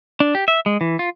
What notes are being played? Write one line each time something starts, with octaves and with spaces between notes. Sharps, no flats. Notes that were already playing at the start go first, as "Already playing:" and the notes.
D4
G4
E5
G#3
E3
F4